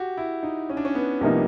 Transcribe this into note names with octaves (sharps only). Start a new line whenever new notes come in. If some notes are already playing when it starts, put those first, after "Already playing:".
Already playing: F#4 G4
E4
D#4
C#4
D4
C#4
B3
C2 C3 F3 A#3 D#4